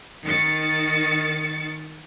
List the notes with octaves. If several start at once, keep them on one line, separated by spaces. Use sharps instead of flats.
D#3 A6 C#7